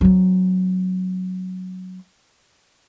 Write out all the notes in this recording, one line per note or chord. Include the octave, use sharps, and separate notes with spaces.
F#3 C4